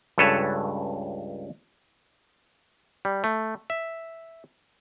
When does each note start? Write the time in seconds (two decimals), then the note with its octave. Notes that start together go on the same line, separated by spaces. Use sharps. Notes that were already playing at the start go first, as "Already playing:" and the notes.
0.18 C#2 G2 A4 B4 C#5 A5
3.05 G3
3.24 A3
3.70 E5